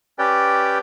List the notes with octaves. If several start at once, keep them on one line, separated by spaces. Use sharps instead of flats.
C#4 G4 B4 D5 G5